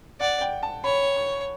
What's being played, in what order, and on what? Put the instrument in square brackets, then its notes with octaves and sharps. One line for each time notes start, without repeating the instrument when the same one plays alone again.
[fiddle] D5 [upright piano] F#5
[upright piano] G5
A5
[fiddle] C#5 [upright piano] B5
[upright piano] C#6